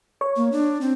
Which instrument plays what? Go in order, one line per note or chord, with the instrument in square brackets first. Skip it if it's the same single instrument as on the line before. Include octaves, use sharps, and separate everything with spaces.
[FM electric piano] C#5
[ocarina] A#3
D4
C4